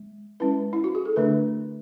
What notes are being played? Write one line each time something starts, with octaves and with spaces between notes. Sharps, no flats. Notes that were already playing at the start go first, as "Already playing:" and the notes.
Already playing: G#3
G#3 C#4 E4 B4
E4
F#4
G#4
A4
D3 A3 D4 B4